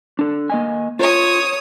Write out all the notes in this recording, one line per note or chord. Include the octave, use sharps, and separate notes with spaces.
D4 A4
A#3 D#5 G#5
F4 C#5 D#6